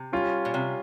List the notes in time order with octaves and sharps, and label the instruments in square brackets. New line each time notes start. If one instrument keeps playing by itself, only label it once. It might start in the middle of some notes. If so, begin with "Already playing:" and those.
Already playing: [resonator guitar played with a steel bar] C3
[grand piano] G3 C#4 F4
[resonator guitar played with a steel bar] A#2
C3